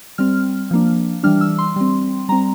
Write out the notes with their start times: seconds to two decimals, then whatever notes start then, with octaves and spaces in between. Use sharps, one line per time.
0.18 G3 C4 F6
0.71 F3 A#3 D4
1.23 E3 G3 D4 F6
1.41 E6
1.58 C6
1.76 G3 C4
2.29 G3 C4 A#5